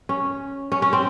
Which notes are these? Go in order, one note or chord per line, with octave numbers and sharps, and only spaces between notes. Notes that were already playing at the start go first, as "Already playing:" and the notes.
C#4
C#4
C#4
C4